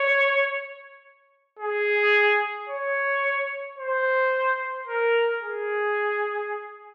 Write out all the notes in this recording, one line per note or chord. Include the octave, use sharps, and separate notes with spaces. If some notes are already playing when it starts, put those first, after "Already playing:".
Already playing: C#5
G#4
C#5
C5
A#4
G#4